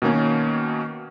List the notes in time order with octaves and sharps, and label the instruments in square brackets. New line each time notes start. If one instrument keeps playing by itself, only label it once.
[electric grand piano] B2 D#3 A#3 C#4